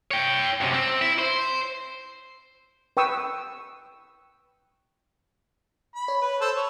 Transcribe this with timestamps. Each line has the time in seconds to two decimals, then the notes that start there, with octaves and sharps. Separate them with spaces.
0.11 C#5 G5
0.61 F#2 C3
0.74 C4
1.02 E4
1.19 C5
2.97 B4 G5 C#6 D#6 E6
5.95 B5
6.08 C#5
6.22 B4
6.41 A4 C5
6.56 C#5